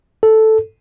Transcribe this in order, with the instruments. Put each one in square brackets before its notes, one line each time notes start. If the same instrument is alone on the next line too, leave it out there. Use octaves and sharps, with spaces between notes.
[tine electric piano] A4